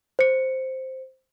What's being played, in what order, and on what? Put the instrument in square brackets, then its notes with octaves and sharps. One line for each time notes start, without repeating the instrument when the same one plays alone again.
[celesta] C5 C#7